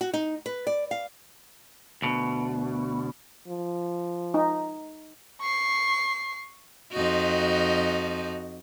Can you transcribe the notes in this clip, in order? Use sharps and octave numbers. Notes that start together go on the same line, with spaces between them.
F#4
D#4
B4
D5
F5
D2 B2
F3
D#4
C#6 C7
F2 D#4 F#4